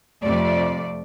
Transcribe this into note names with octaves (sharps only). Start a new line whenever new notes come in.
F2 C3 A3 D5